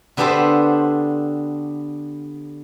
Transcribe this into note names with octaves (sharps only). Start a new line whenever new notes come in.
D3 B3 D4 G4 A4 C5